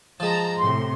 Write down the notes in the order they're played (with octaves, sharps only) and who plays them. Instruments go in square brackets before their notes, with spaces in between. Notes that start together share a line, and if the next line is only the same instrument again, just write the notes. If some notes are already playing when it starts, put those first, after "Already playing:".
[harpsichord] F3 G#3 [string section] A5 A#5
[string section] A2 C3 [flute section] C6